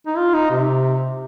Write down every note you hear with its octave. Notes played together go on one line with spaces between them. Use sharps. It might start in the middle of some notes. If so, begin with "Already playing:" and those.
D#4
F4
D#4
C3